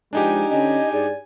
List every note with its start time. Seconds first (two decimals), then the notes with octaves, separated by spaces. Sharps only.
0.13 F3 G#3 D4 D#4 G4 G#5
0.51 D3 C#4 D#5 G#5
0.93 G#2 G#4 D5